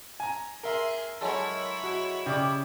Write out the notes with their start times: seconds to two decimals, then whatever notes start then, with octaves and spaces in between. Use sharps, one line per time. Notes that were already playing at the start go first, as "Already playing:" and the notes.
0.20 G#5 A#5
0.63 G#4 A#4 E5 C6
1.21 F#3 G#3 E4 A4 C#5
1.83 F#4
2.26 C#3 G4 D5 D6